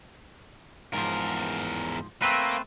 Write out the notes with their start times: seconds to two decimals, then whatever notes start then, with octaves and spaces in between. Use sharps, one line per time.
0.94 E2 G#2 F3 A#4
2.22 A3 A#3 C4 B4